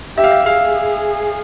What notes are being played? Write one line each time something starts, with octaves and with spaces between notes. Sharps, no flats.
G4 E5
F5
E5
G#4 F5